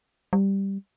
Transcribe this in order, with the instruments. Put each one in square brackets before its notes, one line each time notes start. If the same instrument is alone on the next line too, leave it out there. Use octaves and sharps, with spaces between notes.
[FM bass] G3